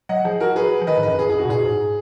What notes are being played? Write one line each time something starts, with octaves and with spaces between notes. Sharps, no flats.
F#3 D#5 F#5
F3 G#4
F#4 A#4
G#4 B4
F3
D#3 B4 D#5
G#2
F#2 B4 D#5
F2 G#4
G#4
F#2
F#4
B2
A#2 G#4
G#2